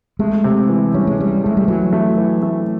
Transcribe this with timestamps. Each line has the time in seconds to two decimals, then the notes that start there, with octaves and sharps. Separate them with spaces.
0.19 G#3 A3
0.44 C3
0.69 E3
0.94 G3 C#4
1.07 G#3
1.18 G3 C#4
1.44 G#3 A3
1.57 G3
1.67 E3 F#3
1.93 A3
2.18 E3
2.42 A3